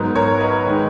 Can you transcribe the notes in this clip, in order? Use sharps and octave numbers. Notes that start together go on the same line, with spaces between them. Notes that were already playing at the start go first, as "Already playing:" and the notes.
Already playing: G#2 F#3 B3 D#4 A#4
A#4 C#5
B4 D#5
D#3 G#3 D#4